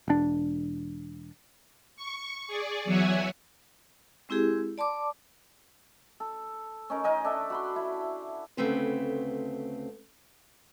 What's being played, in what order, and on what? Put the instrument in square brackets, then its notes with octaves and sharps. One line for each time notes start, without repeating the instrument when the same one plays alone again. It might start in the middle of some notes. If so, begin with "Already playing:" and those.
[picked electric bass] E1 D4
[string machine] C#6
G#4 D5
E2 F#3 C#5 E5 F#5 G#5
[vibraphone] G#3 C4 E4 G4 G#4
D5 A5 C6 D6
[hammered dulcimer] A4
C#4 D#4 A#4
D#4 A#4 D#5 G#5
D4 A4 E5
F#4 B5 C6
E4
[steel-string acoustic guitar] D2 C#3 A3 C4 B4